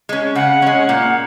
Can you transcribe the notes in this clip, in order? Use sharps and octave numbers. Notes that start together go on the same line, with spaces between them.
G#3 C#4
C#3 F#5
G#3 C#4
A#2